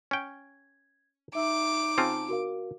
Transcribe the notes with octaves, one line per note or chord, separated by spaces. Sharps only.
C#4 G5 G#6
D#4 E5 D6 E6
C#3 C4 F4 A5
F#4 A#4 F5